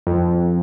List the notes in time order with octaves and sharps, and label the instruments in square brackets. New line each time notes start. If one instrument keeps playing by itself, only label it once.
[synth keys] F2